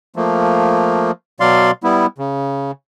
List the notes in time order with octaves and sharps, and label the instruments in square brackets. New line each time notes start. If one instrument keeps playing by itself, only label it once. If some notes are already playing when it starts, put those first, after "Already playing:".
[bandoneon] F3 A3 A#3
B2 F#3 D5 F5 C6
G3 B3 E4
C#3